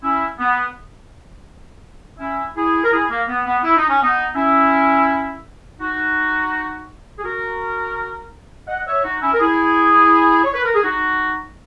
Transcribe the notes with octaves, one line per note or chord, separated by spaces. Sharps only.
C#4 E4
B3
C#4 E4
E4 G#4
A#4
E4 G#4
A#3
B3
B3
E4
D#4
C#4
B3 D#4
C#4 E4
D#4 F#4
G#4
F#4 A#4
D#5 F#5
C#5 E5
D#4 F#4
C#4 E4
A#4
E4 G#4
C#5
B4
A#4
G#4
D#4 F#4